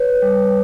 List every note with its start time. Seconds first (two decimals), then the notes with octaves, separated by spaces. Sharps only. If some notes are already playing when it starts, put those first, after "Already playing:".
Already playing: B4 C#5
0.22 G3